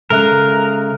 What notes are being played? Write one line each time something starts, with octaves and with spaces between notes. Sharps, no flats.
C#3 G#3 A4 A#4 E5 F#6